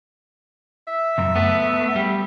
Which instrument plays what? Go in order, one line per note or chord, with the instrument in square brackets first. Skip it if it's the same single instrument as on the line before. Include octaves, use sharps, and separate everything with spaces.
[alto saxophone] E5
[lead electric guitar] C#2 F#2
A3 B3
G3